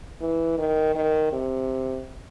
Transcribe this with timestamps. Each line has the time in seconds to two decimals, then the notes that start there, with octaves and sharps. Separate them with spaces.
0.21 E3
0.58 D#3
0.95 D#3
1.32 C3